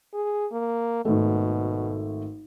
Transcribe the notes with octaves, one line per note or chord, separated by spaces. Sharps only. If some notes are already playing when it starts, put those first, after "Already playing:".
G#4
A#3
G#1 B2 A3